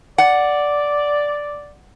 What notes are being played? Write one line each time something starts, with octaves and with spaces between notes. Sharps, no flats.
D5 F#5